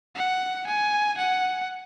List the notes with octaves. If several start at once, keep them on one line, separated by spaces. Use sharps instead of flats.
F#5
G#5
F#5